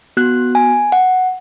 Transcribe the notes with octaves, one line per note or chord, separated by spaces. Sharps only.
B3 F#4 F#6
G#5
F#5